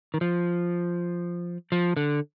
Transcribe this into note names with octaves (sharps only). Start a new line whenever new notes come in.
D#3
F3
F3
D3